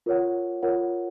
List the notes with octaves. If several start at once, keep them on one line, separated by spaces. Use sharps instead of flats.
F4 A#4 C#5 F#5
F4 A#4 C#5 F#5